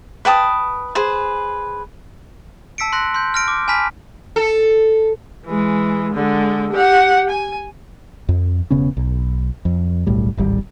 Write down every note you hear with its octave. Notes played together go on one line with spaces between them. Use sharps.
B4 G5 A5 D#6
G#4 B4 C5
A5 E6 B6 C#7 D7
C6 F#6 A#6
C6 G6
F6 A#6 D7
D6
G#5 A5 B5 F6 B6
A4
E3 G#3
D3 G#3
G4 F#5
G#5
F2
E1 C#3 B3 C#4
B1
F2
D1 B1 A2 G3
D1 G#1 G3